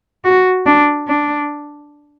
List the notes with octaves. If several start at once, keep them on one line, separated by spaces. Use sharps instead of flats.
F#4
D4
D4